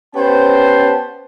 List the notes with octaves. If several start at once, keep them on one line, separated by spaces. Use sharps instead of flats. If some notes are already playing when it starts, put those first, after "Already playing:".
B3 C#4 G4 C5 A5